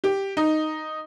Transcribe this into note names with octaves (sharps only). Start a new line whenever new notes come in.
G4
D#4